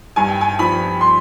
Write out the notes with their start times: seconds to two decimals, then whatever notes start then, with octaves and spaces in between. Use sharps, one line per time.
0.16 G2 G#5
0.28 G5
0.41 G#5
0.59 F3 B5
1.01 C6